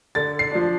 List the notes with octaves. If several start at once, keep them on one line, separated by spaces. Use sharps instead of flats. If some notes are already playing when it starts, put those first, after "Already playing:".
D3 A6
C7
F3 D4